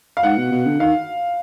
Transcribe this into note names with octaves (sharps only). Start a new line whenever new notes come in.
F5
G#2 F#5
B2
B2
D3
D#3 F5